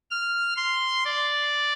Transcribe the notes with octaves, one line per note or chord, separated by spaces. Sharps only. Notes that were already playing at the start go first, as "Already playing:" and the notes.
F6
C6
D5